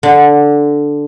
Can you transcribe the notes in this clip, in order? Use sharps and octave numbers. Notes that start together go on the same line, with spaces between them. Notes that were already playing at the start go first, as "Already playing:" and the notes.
D3